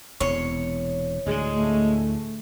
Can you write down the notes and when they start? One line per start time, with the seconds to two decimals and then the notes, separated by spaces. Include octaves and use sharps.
0.21 E1 E2 C3 C#5
1.26 D2 A2 D3 G#3
1.58 A3